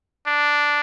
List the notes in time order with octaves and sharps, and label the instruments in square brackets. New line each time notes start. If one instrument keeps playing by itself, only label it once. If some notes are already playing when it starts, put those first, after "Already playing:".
[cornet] D4